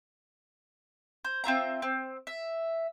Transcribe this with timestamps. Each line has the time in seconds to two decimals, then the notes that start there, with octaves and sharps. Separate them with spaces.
1.24 C5
1.44 C4 F4 E5 A#5
1.82 C4
2.27 E5